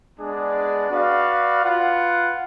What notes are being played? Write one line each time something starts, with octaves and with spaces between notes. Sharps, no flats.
G#3 B3 D4 G#4 D5
F#4 B4 D5 F5
F4 B4 F#5